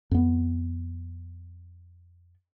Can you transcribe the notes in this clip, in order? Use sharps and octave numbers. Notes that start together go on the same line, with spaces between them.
F2 B3